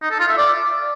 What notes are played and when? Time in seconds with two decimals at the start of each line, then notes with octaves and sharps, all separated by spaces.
0.02 D#4
0.10 A4
0.19 F4
0.28 E5
0.37 D5